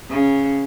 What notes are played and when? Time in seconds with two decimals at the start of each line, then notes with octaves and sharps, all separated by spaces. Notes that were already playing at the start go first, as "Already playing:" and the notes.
0.10 C#3